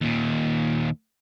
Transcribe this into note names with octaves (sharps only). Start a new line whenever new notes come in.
D#2 A#2